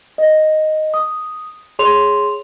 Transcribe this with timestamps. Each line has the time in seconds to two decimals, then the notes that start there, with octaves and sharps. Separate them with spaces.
0.18 D#5
0.94 D#6
1.79 G#4 C#5 C6 F7